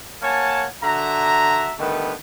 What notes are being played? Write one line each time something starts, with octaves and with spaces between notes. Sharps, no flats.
A#3 C#5 F#5 G#5 A5
D3 F#4 E5 A#5
D3 D#3 G3 A3 B3 B4